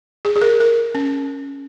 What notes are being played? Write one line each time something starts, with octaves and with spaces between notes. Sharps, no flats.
G#4
G#4
A#4
A#4
C#4